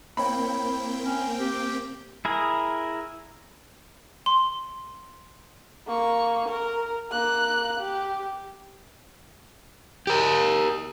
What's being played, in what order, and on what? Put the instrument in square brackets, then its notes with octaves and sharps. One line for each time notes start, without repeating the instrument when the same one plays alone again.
[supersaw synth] A#3 C4 G5 [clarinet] E4 [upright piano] C#5 B5
[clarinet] C#4
G4
[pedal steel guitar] E4 G#4 A#4
[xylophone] C6
[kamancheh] A#3 C#6
A#4
A#3 F#6
G4
[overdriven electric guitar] G4 A#4